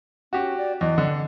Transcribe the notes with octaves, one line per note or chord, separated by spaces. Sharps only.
C#4 F#4 G4
D5
E2 D#5
D3